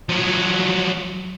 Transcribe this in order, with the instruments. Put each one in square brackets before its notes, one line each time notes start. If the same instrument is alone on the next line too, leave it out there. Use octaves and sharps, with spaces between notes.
[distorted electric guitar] F3 F#3